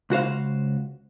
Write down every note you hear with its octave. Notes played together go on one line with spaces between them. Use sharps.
C#2 F#4 C5 F5